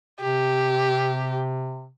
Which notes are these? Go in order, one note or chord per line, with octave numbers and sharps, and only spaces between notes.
C3 G4